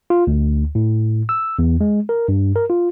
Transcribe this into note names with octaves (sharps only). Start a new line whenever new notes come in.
F4
D2
A2
E6
E2
G#3
A#4
G2
A#4
F4